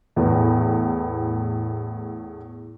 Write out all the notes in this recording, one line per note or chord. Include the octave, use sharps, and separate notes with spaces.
E2 A2 B3